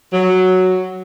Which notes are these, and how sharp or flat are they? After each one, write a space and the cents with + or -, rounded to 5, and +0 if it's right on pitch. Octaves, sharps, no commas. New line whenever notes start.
F#3 +0